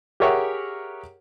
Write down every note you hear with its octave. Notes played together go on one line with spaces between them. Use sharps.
G4 G#4 A#4 C#5 E5 F#5